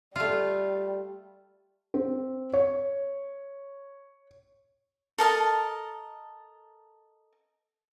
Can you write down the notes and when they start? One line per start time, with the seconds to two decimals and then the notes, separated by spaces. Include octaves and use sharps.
0.16 G3 A3 F4
1.94 C4
2.53 C#5
5.18 A4 A#4 D#5 A5